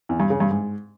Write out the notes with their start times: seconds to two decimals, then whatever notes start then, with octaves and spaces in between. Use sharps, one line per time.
0.09 E2
0.20 G2
0.30 C#3
0.40 G2
0.51 G#2